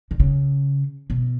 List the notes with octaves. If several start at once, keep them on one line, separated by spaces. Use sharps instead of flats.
D3
C#3
B2